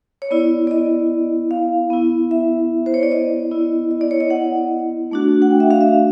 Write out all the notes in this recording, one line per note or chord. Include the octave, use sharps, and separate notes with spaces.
C#5
B3 E4 D5
D5
D#5
F5
B3 E4
E5
C5
C#5
D5
D#5
B3 E4
D#5
D5
C#5
D#5
F#5
A3 D4 F#4
F#5
G5
E5
F5
E5